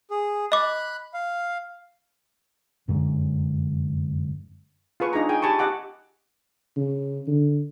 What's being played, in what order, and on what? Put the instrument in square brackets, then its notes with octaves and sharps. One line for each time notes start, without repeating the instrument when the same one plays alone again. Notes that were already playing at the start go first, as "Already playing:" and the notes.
[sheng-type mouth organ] G#4
[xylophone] D#5 D6 [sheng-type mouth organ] B5 F#6
[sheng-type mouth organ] F5
[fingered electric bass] F1 F#2 D3 G#3
[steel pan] F4 G#4 B4 C#6
D4 D#4 G#4 A#5
G#4 G5 G#5
G4 G#5 A5 B5 C#6
G4 D#5 F#5 D6
[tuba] C#3
D3